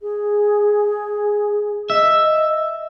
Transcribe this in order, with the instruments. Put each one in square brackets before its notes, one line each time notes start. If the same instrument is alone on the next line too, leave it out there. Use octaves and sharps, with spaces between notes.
[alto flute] G#4
[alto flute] D#5 [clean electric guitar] E5